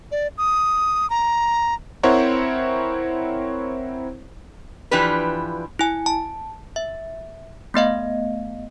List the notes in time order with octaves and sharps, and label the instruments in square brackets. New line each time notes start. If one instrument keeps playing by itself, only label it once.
[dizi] D5
D#6
A#5
[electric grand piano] C4 E4 A#4 C5 C#5 F#5
[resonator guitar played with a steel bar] E3 F3 D4 G4 B4
[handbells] E4 G#5
A5
E5
A3 B3 D#5 F5